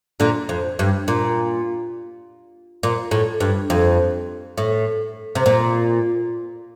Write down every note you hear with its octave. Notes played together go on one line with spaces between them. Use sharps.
A#2 D3
F2
G2
A#2
A#2
A2
G2
F2
A2
C3
A#2